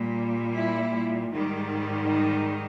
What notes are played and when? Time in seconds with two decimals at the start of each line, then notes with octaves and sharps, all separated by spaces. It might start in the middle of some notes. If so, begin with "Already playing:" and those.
Already playing: A#2 G3
0.54 E4
1.31 G#2 D#3 G3
2.09 D#4